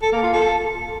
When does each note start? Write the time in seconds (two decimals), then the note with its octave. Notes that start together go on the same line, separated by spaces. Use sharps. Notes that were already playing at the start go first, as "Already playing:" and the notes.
0.02 A4
0.12 A#3
0.23 F4
0.33 A4